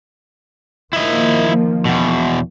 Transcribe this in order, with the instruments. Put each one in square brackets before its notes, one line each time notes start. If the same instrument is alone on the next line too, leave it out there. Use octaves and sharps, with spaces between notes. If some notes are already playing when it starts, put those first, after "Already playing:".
[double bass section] D#3 F3 A#3 [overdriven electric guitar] E4 D#5
[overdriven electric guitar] E2 B2